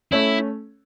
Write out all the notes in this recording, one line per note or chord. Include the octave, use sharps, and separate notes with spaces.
A3 C#4 E4